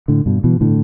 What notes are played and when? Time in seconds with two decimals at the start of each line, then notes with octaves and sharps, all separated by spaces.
0.08 A2 D3
0.26 G2 B2
0.44 B2 E3
0.61 A2 D3